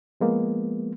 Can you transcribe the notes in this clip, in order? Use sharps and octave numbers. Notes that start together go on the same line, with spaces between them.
F3 G#3 A#3 B3